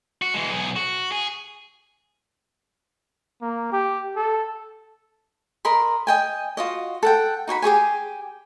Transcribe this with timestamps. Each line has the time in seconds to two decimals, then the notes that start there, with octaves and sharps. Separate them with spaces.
0.22 F#4
0.34 E3 G#3
0.50 B1 G#4
0.76 F#4
1.12 G#4
3.42 A#3
3.72 G4
4.16 A4
5.65 A#4 D#5 B5 C6
6.07 D#5 G5 G#5
6.57 F4 F#4 D#5
7.03 A4 F#5 G5
7.47 D#4 F#4 G5 B5
7.62 G4 G#4 C#5 G#5